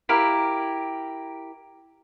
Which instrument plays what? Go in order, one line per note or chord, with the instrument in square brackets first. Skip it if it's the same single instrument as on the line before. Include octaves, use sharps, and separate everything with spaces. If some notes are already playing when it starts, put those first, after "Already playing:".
[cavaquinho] E4 G4 A#4 F5